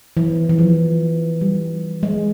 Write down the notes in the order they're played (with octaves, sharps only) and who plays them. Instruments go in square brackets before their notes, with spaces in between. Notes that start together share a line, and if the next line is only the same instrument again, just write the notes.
[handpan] E3
E3
F3
G3
G#3